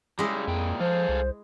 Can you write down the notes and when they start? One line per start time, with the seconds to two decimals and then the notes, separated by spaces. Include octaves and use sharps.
0.19 C#3 G3 G#3 E4
0.48 F2 A#2 G5
0.80 F3 G#4 A4 C5 F5
1.09 C2